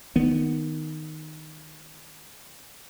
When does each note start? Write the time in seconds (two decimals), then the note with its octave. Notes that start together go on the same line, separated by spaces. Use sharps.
0.16 D#3 B3